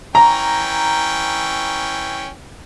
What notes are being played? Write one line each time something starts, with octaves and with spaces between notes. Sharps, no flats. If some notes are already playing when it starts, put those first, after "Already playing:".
E3 C#4 G5 A#5